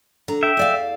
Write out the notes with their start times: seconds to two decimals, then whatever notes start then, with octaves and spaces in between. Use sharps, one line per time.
0.28 D3 A#5
0.43 E5 G5
0.57 E2 D5 F5